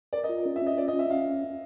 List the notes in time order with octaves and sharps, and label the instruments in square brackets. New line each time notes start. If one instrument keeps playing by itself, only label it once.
[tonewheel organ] A#4 [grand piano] D5
[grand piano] D#5
[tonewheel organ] F4
C#4
[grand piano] E5
[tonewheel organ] C#4 [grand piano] D#5
[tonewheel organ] F4 [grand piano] D5
[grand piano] D#5
[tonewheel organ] C#4
[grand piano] E5
[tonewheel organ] C#4 [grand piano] F5